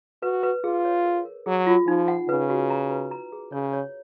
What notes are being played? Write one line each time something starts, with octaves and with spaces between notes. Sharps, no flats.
F#4 B4
B4
F4 G#4
C#5
A#4
A#4
F#3 G#4
F4
F3 D#4
F#5
C#3 B4
F#4
A#5
B4
A#5
G#4
C#3 C#5
C#5